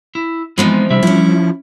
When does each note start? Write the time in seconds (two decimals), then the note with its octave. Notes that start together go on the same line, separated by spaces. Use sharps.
0.15 E4
0.58 E3 F3 G#3 B3 C4 D#4
0.90 C3 G3 D4 E5
1.03 F3 C#4 E4